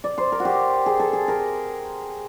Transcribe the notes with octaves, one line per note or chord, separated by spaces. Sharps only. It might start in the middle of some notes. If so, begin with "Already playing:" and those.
D5
C5
A#4
F#4
G4
G#4
A4
G#4
A#4